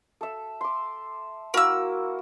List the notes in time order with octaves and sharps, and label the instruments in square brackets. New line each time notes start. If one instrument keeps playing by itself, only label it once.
[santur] A4 E5
C6 D6
[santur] A#3 E4 F#4 [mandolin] A#4 E6